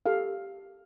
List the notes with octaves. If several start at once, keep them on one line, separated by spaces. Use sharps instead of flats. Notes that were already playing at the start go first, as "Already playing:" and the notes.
G4 A4 F5